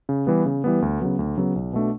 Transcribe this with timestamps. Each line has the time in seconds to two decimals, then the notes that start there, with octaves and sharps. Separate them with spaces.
0.09 C#3
0.27 E3 G3 B3
0.46 C#3
0.64 E3 G3 B3
0.82 D2
1.00 C#3 F#3 B3
1.19 D2
1.37 C#3 F#3 B3
1.56 B1
1.73 B2 A3 D4